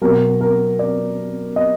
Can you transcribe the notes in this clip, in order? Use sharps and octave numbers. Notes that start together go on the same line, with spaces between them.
B2 F#3 A#4
A#4
D5
D#5